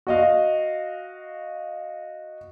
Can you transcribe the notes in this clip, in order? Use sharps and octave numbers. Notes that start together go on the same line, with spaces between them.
F#4 D#5 F5